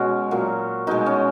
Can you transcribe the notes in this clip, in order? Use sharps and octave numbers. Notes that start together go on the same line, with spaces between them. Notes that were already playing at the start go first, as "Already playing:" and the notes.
Already playing: B2 G#3 C#4 F#4
A#2 F#3
B2 G#3 D#4
C#4